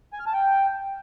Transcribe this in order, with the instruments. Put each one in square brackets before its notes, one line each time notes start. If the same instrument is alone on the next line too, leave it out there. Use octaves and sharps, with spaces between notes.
[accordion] G#5
F6
A5
G5